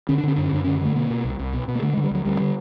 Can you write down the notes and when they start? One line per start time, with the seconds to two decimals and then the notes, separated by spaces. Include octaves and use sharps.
0.09 D3 C#4
0.18 D4
0.23 D3 C#4
0.36 F#2 D4
0.46 C#4
0.52 F#2 D4
0.64 D3 C#4
0.81 D3 A3
0.95 B2 A#3
1.10 B2
1.24 C2
1.39 C2
1.53 B2
1.68 B2
1.75 A#3
1.82 D3 A3
1.93 G#3
1.97 D3
2.04 G3
2.11 D2 F#3
2.25 D2 G3
2.40 D3